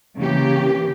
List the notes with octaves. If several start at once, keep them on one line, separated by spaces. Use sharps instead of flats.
C#3 E3 A#3 G4